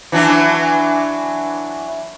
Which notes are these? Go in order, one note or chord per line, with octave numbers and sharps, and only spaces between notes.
E3 F#3 D4